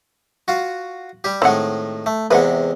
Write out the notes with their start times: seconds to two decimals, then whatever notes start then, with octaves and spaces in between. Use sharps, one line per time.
0.48 F4 F#4
1.24 G3 G4
1.42 A2 D#3 G#3 C4 F#5
2.06 A3
2.31 E2 C3 G#3 B4 F#5